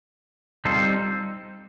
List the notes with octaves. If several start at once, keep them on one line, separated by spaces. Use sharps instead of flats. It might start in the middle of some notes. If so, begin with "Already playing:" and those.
G3 C4 D#4 F4 A4